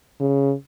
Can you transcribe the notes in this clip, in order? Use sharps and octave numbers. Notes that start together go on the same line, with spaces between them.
C#3